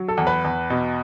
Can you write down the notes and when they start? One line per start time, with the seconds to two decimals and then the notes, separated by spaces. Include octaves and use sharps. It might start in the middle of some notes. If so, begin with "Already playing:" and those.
Already playing: F#3
0.08 A4
0.17 E2
0.27 B4
0.44 E2
0.70 B2